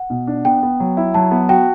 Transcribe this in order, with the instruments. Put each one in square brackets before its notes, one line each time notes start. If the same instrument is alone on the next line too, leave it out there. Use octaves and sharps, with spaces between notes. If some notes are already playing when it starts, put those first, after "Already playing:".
Already playing: [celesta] F#5
[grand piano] B2
D4
[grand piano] B3 [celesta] G5
[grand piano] B3
F#3
E4
[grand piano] F#3 [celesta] A5
[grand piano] B3
[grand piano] F#4 [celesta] G5